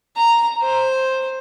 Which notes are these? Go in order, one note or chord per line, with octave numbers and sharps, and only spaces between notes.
A#5
C5